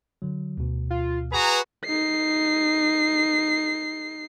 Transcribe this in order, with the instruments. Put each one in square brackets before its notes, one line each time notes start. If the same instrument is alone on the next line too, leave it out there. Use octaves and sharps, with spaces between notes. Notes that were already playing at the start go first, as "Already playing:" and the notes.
[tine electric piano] D3 F#3
D2 B2
[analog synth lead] F4
[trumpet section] F#4 G#4 A#5 [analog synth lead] B4
[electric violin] D#4 C7